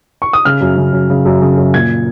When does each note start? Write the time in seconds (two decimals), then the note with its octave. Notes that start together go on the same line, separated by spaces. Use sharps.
0.22 C#6
0.33 D#6
0.45 C#3 F6
0.61 F#2
0.77 C#3
0.93 F#2
1.10 C#3
1.26 F#2
1.41 C#3
1.58 F#2
1.74 A#2 G#6